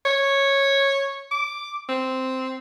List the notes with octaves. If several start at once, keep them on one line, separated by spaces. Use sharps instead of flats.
C#5
D6
C4